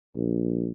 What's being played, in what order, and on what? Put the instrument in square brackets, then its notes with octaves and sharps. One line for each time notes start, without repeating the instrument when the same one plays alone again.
[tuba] A#1